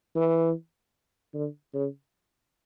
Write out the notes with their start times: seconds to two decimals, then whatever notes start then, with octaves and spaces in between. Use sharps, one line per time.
0.16 E3
1.34 D3
1.74 C#3